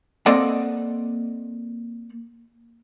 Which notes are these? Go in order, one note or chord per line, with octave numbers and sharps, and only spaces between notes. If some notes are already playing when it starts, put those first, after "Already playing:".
A#3 C4 A4 D5 D#5 F#5